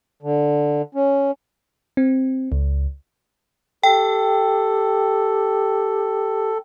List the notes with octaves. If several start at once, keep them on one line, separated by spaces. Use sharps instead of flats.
D3
C#4
C4
C#2
G4 A4 G5